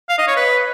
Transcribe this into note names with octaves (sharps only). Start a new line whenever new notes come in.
F5
D#5
C#5
B4